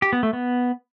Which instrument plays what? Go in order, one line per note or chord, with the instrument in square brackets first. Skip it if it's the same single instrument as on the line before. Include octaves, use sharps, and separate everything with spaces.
[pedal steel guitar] G4
B3
A3
B3